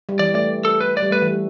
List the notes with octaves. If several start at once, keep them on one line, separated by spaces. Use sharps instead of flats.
G3
E3 D5
A3 D5
A4
B4
D5
G3
A3 B4
E3
G3